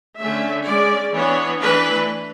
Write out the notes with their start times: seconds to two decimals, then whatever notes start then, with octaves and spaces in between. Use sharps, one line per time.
0.18 D3 A3 C#4 E5
0.66 G#3 C#4 D5
1.13 E3 B3 D4 C#5
1.61 E3 A3 D4 B4